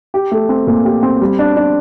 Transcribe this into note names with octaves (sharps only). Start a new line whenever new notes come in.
G4
A3
C4
A#2
G4
C4
G3
D4
D4